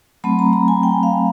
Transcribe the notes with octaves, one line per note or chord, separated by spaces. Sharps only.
F#3 A3 C4 B5
A#5
A#5
G#5
G5
F5